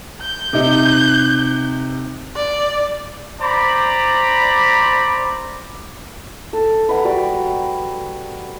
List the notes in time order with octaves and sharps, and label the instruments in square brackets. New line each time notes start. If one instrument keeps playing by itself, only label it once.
[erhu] G6
[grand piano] C3 D#4
[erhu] D5
[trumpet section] C5 D5 A#5 B5 D6
[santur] A4
B4 F#5 A#5
G3 F#4 D5